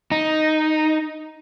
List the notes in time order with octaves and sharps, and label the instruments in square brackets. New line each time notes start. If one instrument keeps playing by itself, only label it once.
[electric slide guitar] D#4